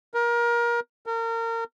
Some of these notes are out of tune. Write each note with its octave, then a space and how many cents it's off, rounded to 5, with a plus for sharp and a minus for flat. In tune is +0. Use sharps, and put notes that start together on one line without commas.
A#4 +25
A#4 -30